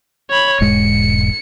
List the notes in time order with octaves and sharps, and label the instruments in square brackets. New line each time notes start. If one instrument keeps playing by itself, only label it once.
[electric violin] C#5 B5
[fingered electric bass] E1 G#2 G#3 [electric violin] C#7